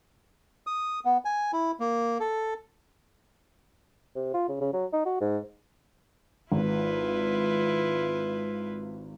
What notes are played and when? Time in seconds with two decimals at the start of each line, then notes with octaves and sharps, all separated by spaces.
0.67 D#6
1.05 B3
1.25 G#5
1.53 E4
1.80 A#3
2.20 A4
4.15 C3
4.34 F4
4.49 C#3
4.61 C#3
4.73 F#3
4.93 D#4
5.05 F#4
5.21 G#2
6.52 G#1 E4 F4 B4